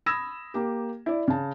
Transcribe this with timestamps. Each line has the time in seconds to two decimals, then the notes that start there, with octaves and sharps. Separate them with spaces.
0.06 B5 D#6 E6 G#6 A#6 E7
0.54 A#3 G4
1.06 E4 D5
1.28 C#3 A5